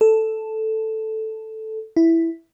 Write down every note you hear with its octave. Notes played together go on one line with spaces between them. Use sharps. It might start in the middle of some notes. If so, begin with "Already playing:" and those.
A4
E4